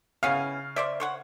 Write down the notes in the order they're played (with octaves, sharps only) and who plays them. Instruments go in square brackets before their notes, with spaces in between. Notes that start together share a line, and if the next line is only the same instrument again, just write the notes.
[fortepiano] C#3 F5 [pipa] B3 C#4 E4
[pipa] C5 D5 E5
C5 C#5 F#5